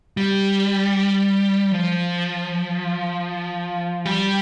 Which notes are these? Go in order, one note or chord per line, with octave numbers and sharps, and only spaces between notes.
G3
F3
G3